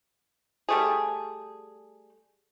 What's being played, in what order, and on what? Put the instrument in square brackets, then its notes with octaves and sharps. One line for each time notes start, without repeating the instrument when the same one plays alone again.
[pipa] G3 A3 G#4